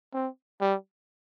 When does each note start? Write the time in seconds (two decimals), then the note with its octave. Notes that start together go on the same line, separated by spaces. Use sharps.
0.14 C4
0.61 G3